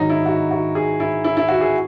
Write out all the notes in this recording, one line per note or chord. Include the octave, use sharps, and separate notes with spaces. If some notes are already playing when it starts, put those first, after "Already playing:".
Already playing: G#2 D#3 F#3 D#4
E4
F#4
F#4
G#4
E4
E4
E4
F#4
G#4